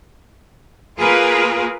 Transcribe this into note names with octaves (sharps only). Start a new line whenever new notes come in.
A#3 F4 G#4 A#4 B4